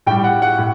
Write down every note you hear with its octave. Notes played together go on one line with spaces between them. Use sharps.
A2 G3 G5
F#5
F#5
A2